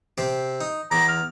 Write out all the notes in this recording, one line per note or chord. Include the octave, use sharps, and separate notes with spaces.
C3 C4 G4
D#4
E2 A#5 D6
F6